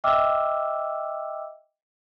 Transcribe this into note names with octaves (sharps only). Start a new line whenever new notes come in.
D#5 E5 G5 D6 E6 F6